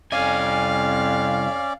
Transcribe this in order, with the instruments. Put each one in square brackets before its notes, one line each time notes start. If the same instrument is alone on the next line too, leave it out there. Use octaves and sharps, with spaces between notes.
[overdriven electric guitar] C2 G#5 [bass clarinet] F2 [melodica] C#4 D5 [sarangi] F5